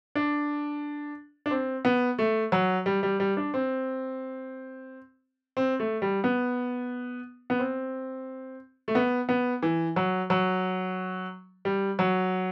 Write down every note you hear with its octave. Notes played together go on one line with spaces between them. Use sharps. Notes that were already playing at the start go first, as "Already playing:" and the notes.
D4
D4
C4
B3
A3
F#3
G3
G3
G3
D4
C4
C4
A3
G3
B3
B3
C4
A3
B3
B3
E3
F#3
F#3
G3
F#3